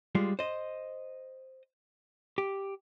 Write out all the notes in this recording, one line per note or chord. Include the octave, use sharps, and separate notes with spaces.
G3 G#3 F4
C5 D#5
G4